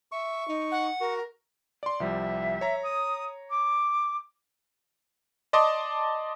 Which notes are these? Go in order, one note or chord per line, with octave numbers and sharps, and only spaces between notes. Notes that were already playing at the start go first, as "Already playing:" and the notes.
E5 C#6
D#4
F#5
F#4 A#4
D5 C6
C2 F3 G3 E5
C#5 A#5
D#6
D6
D5 D#5 A5 C6 D6 D#6